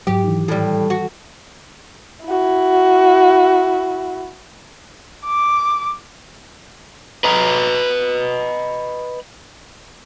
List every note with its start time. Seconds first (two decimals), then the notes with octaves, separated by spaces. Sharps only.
0.07 G#2 F#3 G4
0.24 D#3 E3
0.48 A2 G3
0.90 F#4
2.25 E4 F#4
5.26 D6
7.24 B4 D#5 A#5